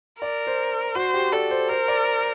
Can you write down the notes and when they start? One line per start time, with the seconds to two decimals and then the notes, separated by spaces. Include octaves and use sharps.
0.21 A#4 D5
0.47 C5
0.95 F#4 C5
1.14 G4
1.32 A4 D5
1.51 C5
1.69 A#4 C5
1.88 D5